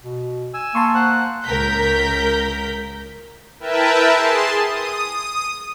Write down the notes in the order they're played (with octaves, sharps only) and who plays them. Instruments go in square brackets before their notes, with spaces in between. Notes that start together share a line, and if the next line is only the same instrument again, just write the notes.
[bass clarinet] B2
[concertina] G#5 E6
[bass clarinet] A#3 [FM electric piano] A5 C6 C#6
[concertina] C5 F#5 F#6
[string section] C#2 A#4 G6 B6
[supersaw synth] E4 A#4 B4 E5 G5 A5
G#4 A5 C6
D#6